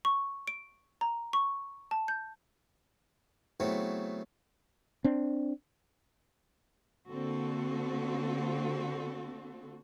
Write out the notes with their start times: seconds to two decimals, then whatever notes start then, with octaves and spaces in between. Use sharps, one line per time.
0.05 C#6
0.48 D7
1.01 A#5
1.33 C#6
1.91 A5
2.08 G6
3.60 C#3 E3 F#3 A3 B3 C4
5.04 C4 D4
7.08 D3 A#3 C4 F#4 A4